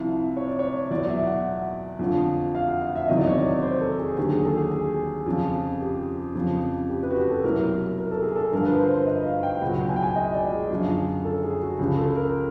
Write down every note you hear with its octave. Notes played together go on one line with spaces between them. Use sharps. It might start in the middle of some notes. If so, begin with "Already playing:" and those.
Already playing: C2 C3 F3
C#5
D5
C#5
E2 B2 F#3 D5
E5
F#5
F2 D3 F3
F5
F#5
F5
E5
E2 C3 D#3 F#3 D#5
D5
C#5
D5
C5
A4
G#4
D#2 D3 F#3 G4
G#4
A4
G#4
G#4
F2 C#3 F3
G4
F2 C#3 F3
G4
B4
F#4
G4
A4
C2 B2 F#3 A#4
A#4
A4
G#4
A4
G2 D3 F3 A#4
B4
C5
C5
D#5
F5
G5
C#2 B2 F#3 F#5
G5
G#5
G5
G#5
D#5
D5
G#4
F#2 D3 F3
A4
G#4
F#4
C#2 C#3 F3 G4
A4
A#4